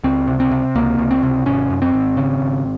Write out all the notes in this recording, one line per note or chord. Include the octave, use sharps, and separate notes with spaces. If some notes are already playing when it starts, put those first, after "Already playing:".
C#2 C4
C3
C4
C3
C#2 A#3
C#2
C4
C3
G#1 C#4
F#2
C4
G#1
C#3
G#1